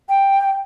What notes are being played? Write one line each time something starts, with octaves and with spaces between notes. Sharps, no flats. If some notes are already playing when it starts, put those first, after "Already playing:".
G5